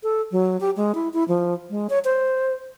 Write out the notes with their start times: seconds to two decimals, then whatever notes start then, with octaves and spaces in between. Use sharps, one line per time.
0.03 A4
0.32 F#3
0.61 G4
0.77 G#3
0.95 E4
1.13 E4
1.28 F3
1.70 G#3
1.90 C#5
2.05 C5